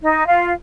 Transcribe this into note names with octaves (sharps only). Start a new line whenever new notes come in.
D#4
F4